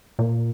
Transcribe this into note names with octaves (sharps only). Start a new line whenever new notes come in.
A#2